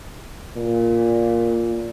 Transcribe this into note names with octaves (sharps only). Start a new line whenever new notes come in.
A#2